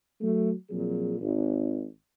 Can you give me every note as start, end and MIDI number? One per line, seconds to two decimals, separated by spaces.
0.21 0.51 54
0.21 0.51 57
0.70 1.15 46
0.70 1.15 53
0.70 1.15 54
0.70 1.15 60
0.70 1.15 68
1.20 1.85 32